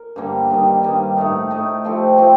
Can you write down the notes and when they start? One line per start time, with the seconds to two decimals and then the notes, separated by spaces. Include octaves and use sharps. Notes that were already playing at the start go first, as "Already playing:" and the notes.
Already playing: A#4
0.16 G2 D3 G3 A#3
0.50 G2 D#3 G3
0.83 G2 D#3 G3
1.17 A2 A3 D#4
1.51 A2 A3 D#4
1.84 F3 A3 C4 G4
2.17 F3 A3 C4 G4